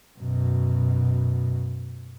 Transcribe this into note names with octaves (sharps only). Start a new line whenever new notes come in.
F#2 B2